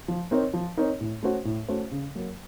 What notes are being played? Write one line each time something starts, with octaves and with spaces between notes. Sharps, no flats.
F3
C4 D#4 A#4 C#5
F3
C4 D#4 A#4 C#5
A2
A3 C#4 F#4 C5
A2
A3 C#4 F#4 C5
C#3
F#3 A#3